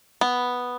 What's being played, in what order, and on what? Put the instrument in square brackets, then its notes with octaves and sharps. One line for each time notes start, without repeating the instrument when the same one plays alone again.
[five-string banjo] B3